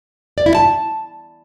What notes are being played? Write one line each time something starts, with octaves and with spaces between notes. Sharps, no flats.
D5
E4
A5